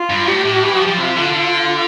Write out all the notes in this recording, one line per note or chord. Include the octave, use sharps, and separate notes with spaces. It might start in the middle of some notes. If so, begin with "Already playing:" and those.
Already playing: F4
G2
A2 G4
A2
E3
F3
F3
C3 F4
D3
D3